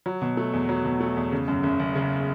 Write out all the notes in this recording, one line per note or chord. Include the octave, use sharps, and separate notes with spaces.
F#3
B2
A3
E2
F#3
B2
A3
E2
C#3
F#2
F#1
F#1
C#3